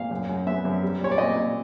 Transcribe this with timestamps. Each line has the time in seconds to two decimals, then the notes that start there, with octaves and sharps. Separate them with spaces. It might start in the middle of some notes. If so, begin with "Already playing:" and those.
Already playing: A#2 F5
0.11 F#2
0.29 F#2
0.46 B3 E5
0.65 F#2
0.83 G3
1.00 A#2 C#5
1.11 D5
1.18 A#2 D#5
1.36 A#2